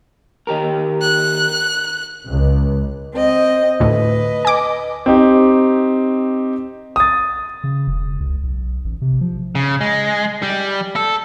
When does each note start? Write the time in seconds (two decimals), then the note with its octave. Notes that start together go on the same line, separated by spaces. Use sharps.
0.47 D#3 G4 A#4
1.01 F#6
2.27 C#2
3.15 C4 D#5
3.80 D2 A2 B4 D#5
4.45 G#5 D6
5.06 C4 D#4 G4
6.96 D#6 A6
7.64 C#3
7.87 E1
8.20 C#2
8.43 B1
8.84 A1
9.02 C3
9.21 F3
9.55 C#3
9.81 G#3
10.42 G3
10.96 A4